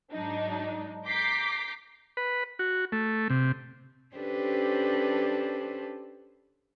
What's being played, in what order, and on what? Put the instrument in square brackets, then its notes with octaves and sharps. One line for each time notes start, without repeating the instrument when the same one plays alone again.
[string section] G#2 F#3 D4 D#4
A#5 D6 G6 B6 C7
[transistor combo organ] B4
F#4
A3
C3
[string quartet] C#4 D4 G4 A4 B4 C5